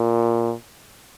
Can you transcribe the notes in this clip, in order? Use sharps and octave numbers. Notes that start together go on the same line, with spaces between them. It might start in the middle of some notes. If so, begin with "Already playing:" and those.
Already playing: A#2